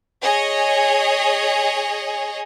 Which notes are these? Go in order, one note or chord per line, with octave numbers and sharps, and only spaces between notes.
G#4 C#5 D#5